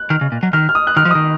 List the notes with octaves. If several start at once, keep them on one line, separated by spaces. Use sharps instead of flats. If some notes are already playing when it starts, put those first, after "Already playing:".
Already playing: F#6
D#3 F6
C#3
A#2
F#3
D#3 F6
F6
D#6
F#6
D#3 F6
F3
D#6
D#3